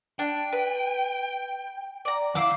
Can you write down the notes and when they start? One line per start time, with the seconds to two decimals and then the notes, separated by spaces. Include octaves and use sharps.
0.19 D4 G5
0.53 B4
2.05 D5 A#5
2.35 E3 E4 F5 D6